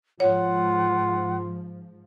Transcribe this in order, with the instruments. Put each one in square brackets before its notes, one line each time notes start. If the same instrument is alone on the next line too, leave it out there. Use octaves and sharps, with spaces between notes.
[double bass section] G#2 F3 [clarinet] F4 [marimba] C#5 [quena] F#5